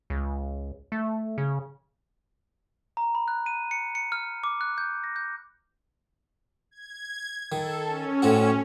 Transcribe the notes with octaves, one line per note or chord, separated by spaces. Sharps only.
C#2
A3
C#3
A#5
B5
F#6
D#7
C#7
C#7
F6
D6
F#6
G6
A#6
G6
G#6
D#3 A4
C#4
A2 C4 F#4